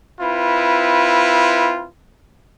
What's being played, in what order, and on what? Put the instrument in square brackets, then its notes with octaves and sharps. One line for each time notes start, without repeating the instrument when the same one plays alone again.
[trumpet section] C4 E4 F4 B4